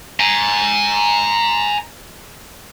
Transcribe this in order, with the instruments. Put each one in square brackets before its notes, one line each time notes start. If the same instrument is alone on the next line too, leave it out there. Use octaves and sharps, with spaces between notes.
[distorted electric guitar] G#5 A#5